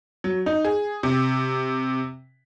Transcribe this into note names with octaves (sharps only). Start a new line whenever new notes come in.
F#3
D#4
G#4
C3